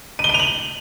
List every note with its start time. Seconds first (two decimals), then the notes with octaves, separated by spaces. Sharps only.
0.19 D#7
0.24 G7
0.29 D#7
0.34 F7
0.39 F#7